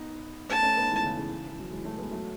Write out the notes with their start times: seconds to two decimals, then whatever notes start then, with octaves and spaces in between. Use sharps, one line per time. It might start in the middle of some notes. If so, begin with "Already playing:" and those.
Already playing: B3 D#4
0.49 A3 C#4 A5
0.63 A3 C#4
0.77 B3 D#4
0.90 E3 G#3
1.04 C#3 E3
1.17 C#3 E3
1.47 E3
1.60 F#3
1.71 E3 G#3
1.85 F#3 A3
1.98 G#3 B3
2.11 F#3 A3